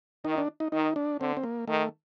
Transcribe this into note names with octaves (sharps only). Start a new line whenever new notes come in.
D#3 D#4
D4
D#4
D#3 D#4
D4
D3 C4
C4
A#3
D#3 A3